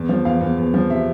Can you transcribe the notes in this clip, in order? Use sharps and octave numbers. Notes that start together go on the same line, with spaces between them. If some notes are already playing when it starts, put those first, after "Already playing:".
Already playing: E2
F3
E2 F5
E2
E2
F3
C3 E5